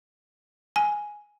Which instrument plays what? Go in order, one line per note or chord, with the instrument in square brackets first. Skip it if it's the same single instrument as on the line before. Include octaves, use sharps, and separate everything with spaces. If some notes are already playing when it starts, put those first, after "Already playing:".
[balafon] G#5